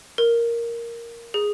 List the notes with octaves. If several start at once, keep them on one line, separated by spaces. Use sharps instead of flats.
A#4
G#4